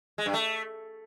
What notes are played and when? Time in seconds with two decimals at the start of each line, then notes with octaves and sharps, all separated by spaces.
0.18 G#3
0.26 G2
0.34 A3